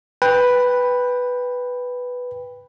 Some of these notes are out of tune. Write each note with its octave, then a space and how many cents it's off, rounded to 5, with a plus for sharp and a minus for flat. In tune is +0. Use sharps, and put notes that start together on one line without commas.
B4 +0 G5 +15